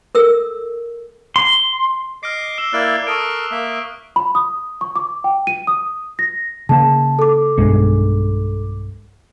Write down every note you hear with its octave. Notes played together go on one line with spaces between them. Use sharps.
A4 A#4 E6
C6
D#5 D6 F6 C7
E6 E7 G7
A#3 E4 D5 D6 F6 F#6
A4 A#4 C#6 D#6 D7
A#3 E5
B5
D#6
C#6
D6
G5
D#7
D#6
A#6
C#3 A#3 A5
A4 D6
B1 G2 G#3